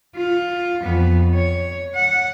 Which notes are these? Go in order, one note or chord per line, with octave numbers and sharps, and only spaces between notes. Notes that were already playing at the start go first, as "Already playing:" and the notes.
F4
F2 B3
C#5
F#5